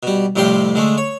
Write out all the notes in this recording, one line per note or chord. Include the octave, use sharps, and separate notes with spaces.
B2 G3
F2 A2 C3 G3 G4 C6
D3 G#3 A3
C#5